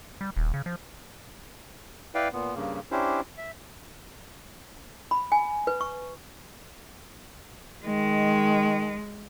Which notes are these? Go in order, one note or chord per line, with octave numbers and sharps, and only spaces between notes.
G3
D#1
C#3
F3
E4 B4 D5 F5 G5
A#2 B3
G2 C#3 A#3
C#4 D4 E4 G4 C5
E5
B5
G#5
B4
C#6
D#3 G#3